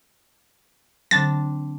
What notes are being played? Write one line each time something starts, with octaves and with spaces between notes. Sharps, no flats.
D3 F#3 C4 D4 A6